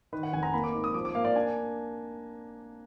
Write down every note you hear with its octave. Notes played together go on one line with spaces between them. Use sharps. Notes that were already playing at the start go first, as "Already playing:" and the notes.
D#3 B4
F#5
F1 G#5
A#5
A#3 B5
D6
G#2
D#6
F3 D6
D6
A#3 F5
D5
D4 G#5